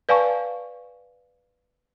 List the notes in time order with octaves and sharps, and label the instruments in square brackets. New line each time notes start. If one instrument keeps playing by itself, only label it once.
[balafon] B4 D5 F5 G#5 A5 C#6